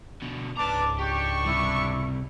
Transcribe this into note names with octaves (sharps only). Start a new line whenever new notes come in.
B2 D3
C#2 G#2 D4 B4 A5 A#5 D6
D4 G4 G5 C#6
C3 G3 E4